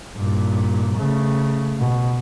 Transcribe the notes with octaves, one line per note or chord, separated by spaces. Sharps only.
G2 A#2
C#3 A3
B2